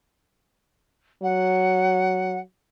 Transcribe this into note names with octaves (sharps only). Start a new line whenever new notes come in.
F#3 F#5